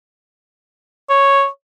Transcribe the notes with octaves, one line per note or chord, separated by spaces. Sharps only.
C#5